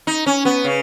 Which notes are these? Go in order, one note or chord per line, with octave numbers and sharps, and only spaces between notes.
D#4
C#4
B3
C#3